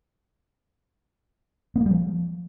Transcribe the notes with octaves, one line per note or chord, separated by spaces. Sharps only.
B3
A#3
G3
F3